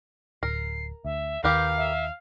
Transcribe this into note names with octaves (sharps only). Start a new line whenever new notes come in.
D1 A#4 C7
D2 E5
D#2 D#3 G4 A#4 B4 F5 G6
E5